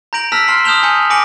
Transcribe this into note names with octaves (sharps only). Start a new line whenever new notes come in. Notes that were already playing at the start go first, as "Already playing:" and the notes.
A#5 G6 A#6 D7 F#7
A5 E6 F6 A#6 B6
A5 C6 F6 C7 F#7
D#6 F6 G6 E7 F7 G7
G#5 A#5 G6 C#7 F#7
G#5 D6 A#6 C#7 D7 F#7